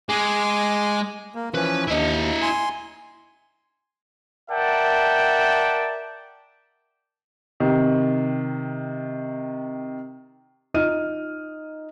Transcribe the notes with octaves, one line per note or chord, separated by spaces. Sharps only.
G#3 G#5 D6
A#3
E3 F3 C#4 B4
D#2 E4 D#5
G#5 C6
A#4 D5 E5 F#5 G5 A5
C3 D#3
D#4 F4 D#5 F6 D#7